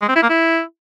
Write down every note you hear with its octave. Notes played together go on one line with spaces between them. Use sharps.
G#3
C4
E4
A#3
E4